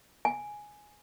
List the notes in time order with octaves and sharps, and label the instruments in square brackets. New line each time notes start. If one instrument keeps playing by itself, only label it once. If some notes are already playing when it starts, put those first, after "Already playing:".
[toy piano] G#5